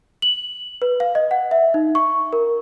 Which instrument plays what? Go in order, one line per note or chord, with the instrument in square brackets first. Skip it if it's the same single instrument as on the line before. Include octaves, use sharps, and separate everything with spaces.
[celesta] F#7
B4
F5
D#5
F#5
E5
D#4
C#6
A#4